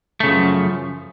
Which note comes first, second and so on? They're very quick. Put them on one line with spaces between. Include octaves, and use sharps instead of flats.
A3 C#3 F3 F#2